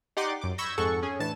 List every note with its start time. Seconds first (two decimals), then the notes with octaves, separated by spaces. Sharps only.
0.17 D#4 G4 D5 F#5 C6 D6
0.41 F#2 D6
0.58 B5 C#6 E6 G6 G#6 A#6
0.78 F2 G#2 G#4 A4 F#5 C#6
1.03 C#4 G#4
1.20 A2 E3 D4 A5 E7